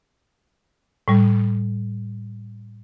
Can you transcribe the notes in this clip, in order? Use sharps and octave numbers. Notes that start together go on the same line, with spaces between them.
A2 G3